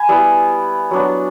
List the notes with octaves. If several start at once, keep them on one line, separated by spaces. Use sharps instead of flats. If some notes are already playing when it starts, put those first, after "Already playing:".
Already playing: G#5 B5
G3 B3 E4
F#3 B3 D4